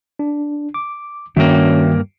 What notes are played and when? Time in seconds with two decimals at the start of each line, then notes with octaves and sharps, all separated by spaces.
0.19 D4
0.74 D6
1.37 G2 D#3 A#3 C#4 F#4 E5 G5